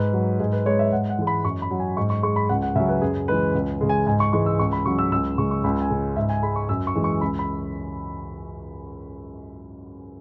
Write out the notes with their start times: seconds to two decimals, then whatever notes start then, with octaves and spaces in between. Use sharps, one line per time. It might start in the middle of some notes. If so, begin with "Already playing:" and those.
Already playing: G#2 B4
0.13 F#3
0.40 G#2 G#4
0.52 B4
0.66 G#3 C#5
0.79 E5
0.92 G#2 F#5
1.10 F#5
1.19 E3 G#3
1.27 B5
1.44 F#2 C#6
1.62 B5
1.71 F#3
1.80 G#5
1.97 G#2 C#6
2.10 C#6
2.23 G#3 C#6
2.36 B5
2.49 C#2 F#5
2.62 F#5
2.76 C#3 E5
2.80 F#3
2.89 B4
3.02 F#2 G#4
3.28 E3 G#3 B4
3.55 C#2
3.81 C#3 G#3
3.89 G#5
4.07 G#2 G#5
4.20 C#6
4.33 E3 G#3 C#6
4.46 E6
4.59 C#2 C#6
4.73 B5
4.86 C#3 F#3 C#6
4.99 E6
5.12 C#2 E6
5.38 C#3 G#3 C#6
5.51 C#6
5.64 C#2 B5
5.82 G#5
5.90 C#3 G#3
6.16 G#2 E5
6.29 G#5
6.43 G#3 B5
6.56 C#6
6.69 F#2 E6
6.87 C#6
6.95 E3 G#3
7.04 C#6
7.21 C#2 B5
7.39 B5